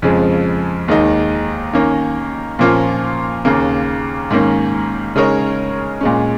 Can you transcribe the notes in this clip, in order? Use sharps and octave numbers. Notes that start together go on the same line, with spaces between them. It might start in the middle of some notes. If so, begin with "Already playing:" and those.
F2 C#3 F3 G#3
D#2 D#3 G#3 D#4
D#3 A#3 C#4
A#2 F3 A#3 C#4 F4
D#2 C#3 A#3
G#2 D#3 A#3 C#4
C#3 G#3 D#4 A#4 C#5
A#2 G#3 C#4